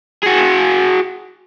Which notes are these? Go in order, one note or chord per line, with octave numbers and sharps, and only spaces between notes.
F#4 G#4